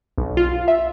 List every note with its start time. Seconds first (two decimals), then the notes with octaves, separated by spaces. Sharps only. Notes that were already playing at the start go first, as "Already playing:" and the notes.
0.18 B1
0.37 F4
0.68 E5